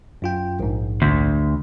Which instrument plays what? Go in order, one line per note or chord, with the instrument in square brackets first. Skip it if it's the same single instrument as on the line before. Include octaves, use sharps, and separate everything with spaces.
[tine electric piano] F#2 F4 G5
A#1 G#2
[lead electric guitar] D2